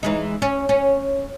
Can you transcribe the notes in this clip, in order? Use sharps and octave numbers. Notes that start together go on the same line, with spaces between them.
E3 G#3 D#4
C#4
C#4